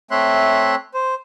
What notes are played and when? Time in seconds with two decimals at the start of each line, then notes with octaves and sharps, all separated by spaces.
0.11 A3 C4 C#5 E5 C6 F#6
0.94 C5